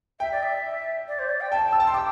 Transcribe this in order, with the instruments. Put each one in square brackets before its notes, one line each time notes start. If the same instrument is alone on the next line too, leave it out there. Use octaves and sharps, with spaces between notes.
[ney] E5 [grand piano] G5
[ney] D5
E5
D5
C5
D5
G5
[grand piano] G5 [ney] A5
[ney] A5
[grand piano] E6
[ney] G5 [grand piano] A5
[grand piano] C6
D6